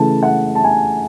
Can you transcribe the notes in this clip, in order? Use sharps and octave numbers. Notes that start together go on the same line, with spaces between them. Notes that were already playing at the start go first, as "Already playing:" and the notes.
Already playing: C#3 E3 A3 A5
F#5
A5
G#5